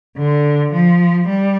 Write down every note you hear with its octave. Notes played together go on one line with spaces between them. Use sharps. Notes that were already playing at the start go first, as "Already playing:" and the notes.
D3
F3
G3